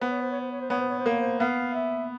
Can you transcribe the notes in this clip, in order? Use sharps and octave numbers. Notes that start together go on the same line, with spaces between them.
B3 C5
C#5
C5
C#5
C5
C#5
C5
B3 C#5
C5
C#5
C5
A#3 C#5
C5
B3 F5
E5